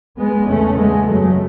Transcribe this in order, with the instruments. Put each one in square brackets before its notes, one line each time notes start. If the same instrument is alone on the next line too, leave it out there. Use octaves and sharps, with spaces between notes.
[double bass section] G#3 B3
E2 C#3 A3 C#4
G#3 B3
F#2 C#3 F#3 A3